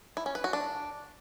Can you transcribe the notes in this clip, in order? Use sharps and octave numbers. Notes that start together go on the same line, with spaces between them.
E4
C#4
B4
F#4
D4